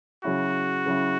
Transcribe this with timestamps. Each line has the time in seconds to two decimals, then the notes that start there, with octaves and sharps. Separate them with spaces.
0.23 C#3 F#3 C#4 E4 F#4
0.86 C#3 F#3 C#4 E4